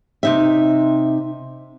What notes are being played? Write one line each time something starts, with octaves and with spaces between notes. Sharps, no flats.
C3 D#4 E5